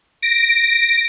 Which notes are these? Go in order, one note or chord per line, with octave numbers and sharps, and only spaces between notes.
A#6 D7